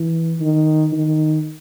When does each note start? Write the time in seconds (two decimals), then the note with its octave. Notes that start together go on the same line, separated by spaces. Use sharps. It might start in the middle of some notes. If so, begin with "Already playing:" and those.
Already playing: E3
0.40 D#3
0.92 D#3